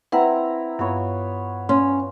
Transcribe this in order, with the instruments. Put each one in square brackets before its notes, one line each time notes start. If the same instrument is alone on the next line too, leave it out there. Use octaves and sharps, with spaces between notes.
[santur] C4 E4 A#5 [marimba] B4 E5 F#5
[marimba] G2 [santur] B3 F4 C#5
[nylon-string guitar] C#4 [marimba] C6